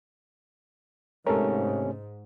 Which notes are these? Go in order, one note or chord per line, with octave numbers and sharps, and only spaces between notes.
G#2 C3 A3 C#4 A4 A#4